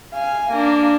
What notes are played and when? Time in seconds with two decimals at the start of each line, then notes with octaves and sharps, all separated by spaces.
0.13 F5 G#5
0.52 A#3 D4